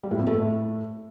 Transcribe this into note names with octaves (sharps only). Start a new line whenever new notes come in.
G3
A2
F2
A3
A2